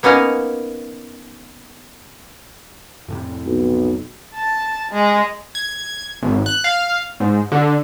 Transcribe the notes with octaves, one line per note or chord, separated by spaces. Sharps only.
A#3 B3 C#4 D#4 F5
F2 A2 C3
B1
A5
G#3
G#6
G#1
F#6
F5
G#2
D3